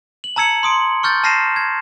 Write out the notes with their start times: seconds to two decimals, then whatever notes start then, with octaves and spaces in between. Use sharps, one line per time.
0.24 F#7
0.36 A5 A#5 E6 G#6 C#7 F#7
0.63 C6 D#6 D7
1.03 C#6 F6 G6 A6
1.23 A5 F6 A#6 C7 D#7 E7
1.56 G#6